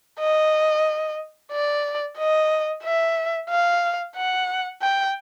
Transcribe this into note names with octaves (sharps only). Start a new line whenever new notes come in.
D#5
D5
D#5
E5
F5
F#5
G5